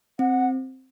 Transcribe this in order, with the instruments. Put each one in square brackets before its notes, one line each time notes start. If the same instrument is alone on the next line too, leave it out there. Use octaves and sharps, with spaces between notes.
[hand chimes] C4 [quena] F#5